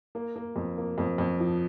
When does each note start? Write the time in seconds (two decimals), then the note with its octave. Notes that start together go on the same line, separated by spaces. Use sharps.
0.15 A#3
0.36 A#3
0.56 F2
0.78 A#3
0.98 F2
1.18 F2
1.40 F3